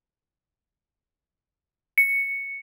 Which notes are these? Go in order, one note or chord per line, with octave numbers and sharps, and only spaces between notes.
C#7